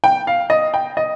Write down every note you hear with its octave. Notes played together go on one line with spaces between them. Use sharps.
G5
F5
D#5
G5
D#5